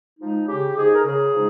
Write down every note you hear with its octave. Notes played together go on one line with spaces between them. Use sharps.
F3 G#3 D#4
C#3 G4
F3 G#3 D#4 G#4
A#4
C#3 G#4
F3 G#3 D#4